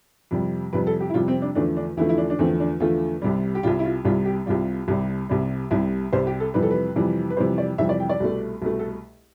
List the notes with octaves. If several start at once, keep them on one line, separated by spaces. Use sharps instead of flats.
F2 C3 G3
F2 C3 G3 B4
A4
G4
E4
F2 C3 G3 F4
C4
D4
E2 D3 F3 A3 D4
D4
E2 D3 F3 A3 E4
E4
D4
D4
E2 D3 F3 A3 C4
D4
E2 D3 F3 A3 F4
C2 C3 G3
G4
C2 C3 G3 F4
E4
F4
C2 C3 G3 F4
G4
C2 C3 G3 F4
C2 C3 G3
C2 C3 G3
C2 C3 G3 E4
C2 C3 G3 C5
G4
A4
F2 C3 E3 G3 B4
A4
B4
F2 C3 E3 G3
B4
F2 C3 E3 G3 C5
D5
F2 C3 E3 G3 E5
D5
G5
D5
C2 B2 A3
C2 B2 A3
A4